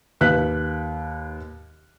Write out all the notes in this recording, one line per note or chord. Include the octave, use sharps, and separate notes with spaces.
D#2 B4 F#6 B6